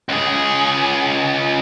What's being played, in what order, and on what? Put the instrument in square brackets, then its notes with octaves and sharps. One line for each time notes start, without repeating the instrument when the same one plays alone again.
[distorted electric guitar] C#2 G#4